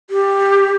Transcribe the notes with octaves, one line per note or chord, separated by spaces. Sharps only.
G4